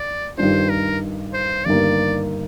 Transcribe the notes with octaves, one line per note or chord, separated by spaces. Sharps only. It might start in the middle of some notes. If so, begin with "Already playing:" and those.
Already playing: D5
G2 D#3 G3 D4 F4 C5
A#4
C5
G1 G2 D#3 G3 A#3 D5